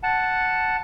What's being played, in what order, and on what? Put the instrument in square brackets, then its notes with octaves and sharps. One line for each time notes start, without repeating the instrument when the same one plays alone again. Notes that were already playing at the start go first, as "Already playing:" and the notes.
[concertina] F#5 A5